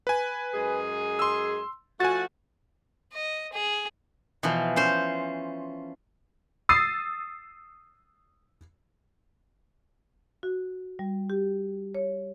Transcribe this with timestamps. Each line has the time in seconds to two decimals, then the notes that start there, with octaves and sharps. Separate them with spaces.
0.07 B4 G#5
0.54 F#2 G#3 G#4
1.19 C6 E6
2.00 F3 A3 F#4 G#5 A6
3.13 D#5
3.53 G#4
4.43 B2 E3 F3
4.76 C#4 C5
6.69 D#6 E6 A6 C7 D#7
10.43 F#4
10.99 G3
11.30 G4
11.95 C#5